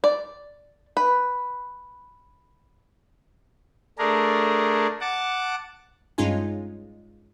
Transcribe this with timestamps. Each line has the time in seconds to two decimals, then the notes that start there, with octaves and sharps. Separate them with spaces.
0.04 D5
0.97 B4
3.98 A3 D4 G#4 A#4
5.01 F#5 A5 D6
6.18 G2 G#3 C#4 D#4 F4 G#5